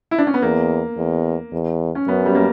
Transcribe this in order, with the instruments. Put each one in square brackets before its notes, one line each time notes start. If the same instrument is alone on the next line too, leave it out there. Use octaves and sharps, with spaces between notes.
[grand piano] E4
D4
C#4
B3
[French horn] E2 [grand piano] A#3
[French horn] E2
E2
[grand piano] C#4
[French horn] F#2 [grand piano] B3
[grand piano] G3
A#3